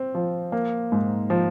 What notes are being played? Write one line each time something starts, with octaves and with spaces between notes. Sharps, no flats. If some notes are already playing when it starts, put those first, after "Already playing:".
Already playing: C4
F3
A#3
G#2
F3